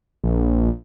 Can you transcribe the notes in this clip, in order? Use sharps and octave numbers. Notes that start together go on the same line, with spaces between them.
A#1